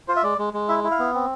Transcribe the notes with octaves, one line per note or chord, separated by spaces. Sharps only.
F4 C5
E5
G#3 D5
G#3
G#3
E4 E5
E4
F5
B3
C4